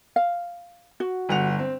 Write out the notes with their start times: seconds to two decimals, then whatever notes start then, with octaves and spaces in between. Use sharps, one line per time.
0.16 F5
1.00 F#4
1.29 G1 F#5 F7
1.59 C4